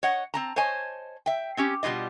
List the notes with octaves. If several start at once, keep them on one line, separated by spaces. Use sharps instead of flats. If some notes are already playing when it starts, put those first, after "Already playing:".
C#5 D#5 F#5
C4 A5 A#5
C5 C#5 D#5 G#5 A5
E5 G5
C4 C#4 G4
B2 G3 D#4 F4 D#5